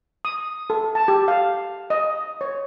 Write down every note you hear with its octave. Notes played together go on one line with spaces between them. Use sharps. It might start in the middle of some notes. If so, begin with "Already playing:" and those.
D#6
A4
A5
G4
F5
D#5
C#5